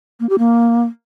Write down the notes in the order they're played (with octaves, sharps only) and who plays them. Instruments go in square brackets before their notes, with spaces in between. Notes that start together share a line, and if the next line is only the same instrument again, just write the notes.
[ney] A#3
G4
A#3